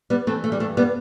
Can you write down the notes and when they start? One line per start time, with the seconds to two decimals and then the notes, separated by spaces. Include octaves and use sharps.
0.10 G3 B3
0.27 E3 A3 C4
0.44 A3
0.52 G3
0.60 G2 A3
0.77 G3 B3